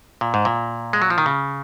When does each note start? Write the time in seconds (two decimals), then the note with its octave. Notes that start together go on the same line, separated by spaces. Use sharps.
0.21 A#2
0.34 G#2
0.45 A#2
0.93 G#3
1.02 F#3
1.10 F3
1.18 D#3
1.26 C#3